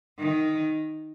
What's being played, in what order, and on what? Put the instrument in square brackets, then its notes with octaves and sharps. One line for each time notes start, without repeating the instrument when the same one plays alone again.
[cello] D#3